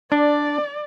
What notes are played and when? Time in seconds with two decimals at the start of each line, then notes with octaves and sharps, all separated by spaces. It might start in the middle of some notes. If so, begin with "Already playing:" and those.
0.12 D4 D5